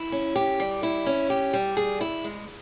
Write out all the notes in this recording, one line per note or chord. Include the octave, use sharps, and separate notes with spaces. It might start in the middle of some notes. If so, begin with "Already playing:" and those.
Already playing: E4
C#4
G4
G3
E4
C#4
G4
G3
G#4
E4
G#3